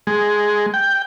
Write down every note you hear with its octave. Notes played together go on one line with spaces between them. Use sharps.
G#3
G5